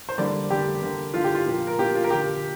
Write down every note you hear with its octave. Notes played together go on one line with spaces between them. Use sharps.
C5
D3 G3 A#3 D5
D3 G3 A#3 G4
D3 A#3
D3 A#3 F4
G4
F4
A#2 F3 A#3
A#4
A#2 F3 A#3 G4
F4
A#4
D3 A#3 G4